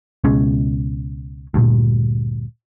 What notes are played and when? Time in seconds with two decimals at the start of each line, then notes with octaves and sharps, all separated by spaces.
0.24 C#2 B2 G#3 C#4
1.54 D2 G2 A#2